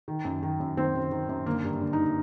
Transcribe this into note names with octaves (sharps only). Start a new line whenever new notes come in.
D#3
F#2
D#3
F#2
D#3 C4
F#2
D#3
F#2
D3 A#3
G2
D3
D#4